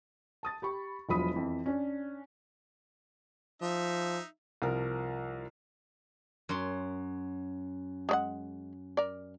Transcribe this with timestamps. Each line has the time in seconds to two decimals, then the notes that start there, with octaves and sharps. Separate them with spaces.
0.43 A5 D#6 A6
0.62 G4 B5 C#6
1.09 E1 F3 F#3 B5 D#6 B6
1.34 F2 E3
1.66 C#4 D4 C#5
3.62 F3 D#4 E5
4.62 C2 F3 A#4
6.49 F#2 C6
8.09 G#3 D5 F#5
8.97 A#4 D5